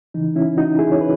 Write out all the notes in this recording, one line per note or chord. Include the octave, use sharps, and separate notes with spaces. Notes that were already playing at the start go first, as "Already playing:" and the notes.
C#3 E3 D#4
C#4 E4
D#4 F#4
E4 G#4
C#5
B4